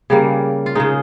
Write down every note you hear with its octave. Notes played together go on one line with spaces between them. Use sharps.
C#3 G3 A#3
F4
C#3 G#3 D#4